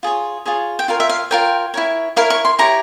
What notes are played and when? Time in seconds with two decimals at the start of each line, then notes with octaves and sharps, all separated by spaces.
0.03 F4 G#4 C#5
0.46 F4 G#4 C#5
0.79 G5
0.88 F4 A#4 C#5 F5
1.00 E5
1.09 F5
1.31 F4 A#4 C#5 G5
1.74 E4 A#4 C#5
2.16 E4 A#4 C#5 F5
2.30 C#6
2.45 C6
2.59 E4 G4 C#5 A#5